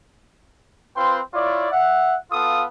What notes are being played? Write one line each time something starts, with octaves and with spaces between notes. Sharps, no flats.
C4 F4 B4 C5 G5 C6
E4 F4 C#5 D5
E5 F#5
B3 F4 A4 F5 D#6